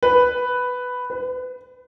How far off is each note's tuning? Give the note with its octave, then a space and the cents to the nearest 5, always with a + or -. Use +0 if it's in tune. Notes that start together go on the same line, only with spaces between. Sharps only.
B4 +5
B4 +35